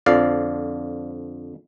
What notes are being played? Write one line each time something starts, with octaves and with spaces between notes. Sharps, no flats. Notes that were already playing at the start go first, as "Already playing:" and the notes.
F2 D3 F3 D5 F5